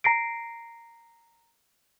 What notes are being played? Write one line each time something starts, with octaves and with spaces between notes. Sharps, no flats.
A#5 A#6 C7 D7